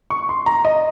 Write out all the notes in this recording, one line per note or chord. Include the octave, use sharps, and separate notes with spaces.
C#6
C6
A#5
D#5